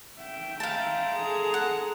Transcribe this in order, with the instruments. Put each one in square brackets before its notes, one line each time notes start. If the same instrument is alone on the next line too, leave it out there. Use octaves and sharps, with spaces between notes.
[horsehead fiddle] E5 G5
[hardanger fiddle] G#3 A#5 [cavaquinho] F5 A5
[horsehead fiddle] G#4 A4
[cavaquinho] F#5